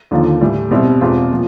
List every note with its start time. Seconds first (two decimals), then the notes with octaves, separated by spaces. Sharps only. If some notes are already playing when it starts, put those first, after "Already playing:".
0.11 D#2 D3 F3 A#3
0.41 A2 E3 G3
0.71 B2 G3 C4 E4
1.01 E2 B2 G#3 C4 F4
1.30 A#2 F3